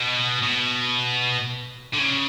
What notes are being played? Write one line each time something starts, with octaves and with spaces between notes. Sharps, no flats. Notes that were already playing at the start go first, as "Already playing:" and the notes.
Already playing: B2
B2
D3
C#3